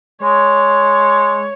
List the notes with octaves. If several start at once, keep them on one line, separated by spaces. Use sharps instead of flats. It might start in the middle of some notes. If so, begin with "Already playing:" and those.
G#3 C#5